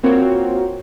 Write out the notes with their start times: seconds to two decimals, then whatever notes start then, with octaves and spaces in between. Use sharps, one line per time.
0.03 A#3 C4 F4 F#4 A#4 C#5